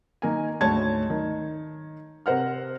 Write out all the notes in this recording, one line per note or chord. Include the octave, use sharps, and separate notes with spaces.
D#3 A#3 G#5
D2 G#2 C#5 A5 G#6
D#3
C3 A#4 C5 F#5 F6